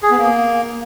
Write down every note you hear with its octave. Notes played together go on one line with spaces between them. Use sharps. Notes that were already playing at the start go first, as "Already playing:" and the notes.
G#4
B3
A#3